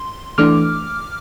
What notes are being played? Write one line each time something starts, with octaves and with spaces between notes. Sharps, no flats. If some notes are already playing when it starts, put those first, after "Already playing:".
Already playing: C6
E3 A3 D4 D6 F6